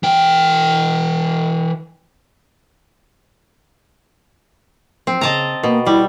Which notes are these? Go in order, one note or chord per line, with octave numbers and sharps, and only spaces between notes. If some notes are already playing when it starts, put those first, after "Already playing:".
E3 G5
F3 C4
C#3 D#5 A5 A#5
B2 A#3
G3 E4